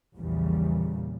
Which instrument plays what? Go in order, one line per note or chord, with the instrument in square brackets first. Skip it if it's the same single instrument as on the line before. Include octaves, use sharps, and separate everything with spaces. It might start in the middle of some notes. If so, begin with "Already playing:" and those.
[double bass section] A#1 E2 A#2 C#3 G3